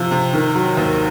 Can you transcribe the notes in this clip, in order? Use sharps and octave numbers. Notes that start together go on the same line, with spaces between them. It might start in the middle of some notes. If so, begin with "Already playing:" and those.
Already playing: C3 F3
C3
D#3
F#3
D#2